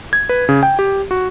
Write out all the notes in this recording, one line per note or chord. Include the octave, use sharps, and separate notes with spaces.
G#6
B4
C#3
G5
G4
F#4